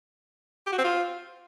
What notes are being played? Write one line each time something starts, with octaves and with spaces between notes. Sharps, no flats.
G4
F#4
C4
F4